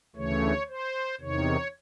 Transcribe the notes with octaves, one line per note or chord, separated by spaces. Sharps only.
D2 C#3 E3 A3 C#5
C5
E2 C3 D#3 C#5